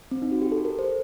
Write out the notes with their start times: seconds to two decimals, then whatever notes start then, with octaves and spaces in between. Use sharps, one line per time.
0.11 C4
0.22 D#4
0.32 F#4
0.42 G4
0.52 A4
0.65 A#4
0.79 C5